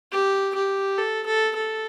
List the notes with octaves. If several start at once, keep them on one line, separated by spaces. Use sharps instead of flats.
G4
G4
A4
A4
A4